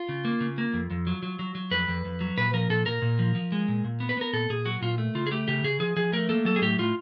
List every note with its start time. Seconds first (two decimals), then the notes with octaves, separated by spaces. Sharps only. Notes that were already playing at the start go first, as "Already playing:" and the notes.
Already playing: F4
0.09 C#3
0.25 A#3
0.40 C#3
0.58 A#3
0.74 F2
0.90 F2
1.07 F#3
1.23 F#3
1.39 F#3
1.55 F#3
1.71 F2 B4
1.88 F2
2.05 F2
2.21 F#3
2.37 A#2 B4
2.53 F3 A#4
2.70 A#2 A4
2.86 A#2 A#4
3.02 A#2
3.19 F3
3.35 F3
3.52 G#3
3.68 A#2
3.84 A#2
4.00 B3
4.09 B4
4.17 B3 A#4
4.33 A#2 A4
4.49 A#2 G#4
4.65 F#3 F#4
4.82 A#2 F4
4.98 A3
5.15 C#3 F4
5.27 G#4
5.31 A3 G4
5.48 C#3 G4
5.64 C#3 G#4
5.80 F3 G#4
5.97 F3 G#4
6.12 A3 A#4
6.29 A#3 A4
6.45 F#3 A4
6.56 G#4
6.62 A2 G4
6.79 A2 F4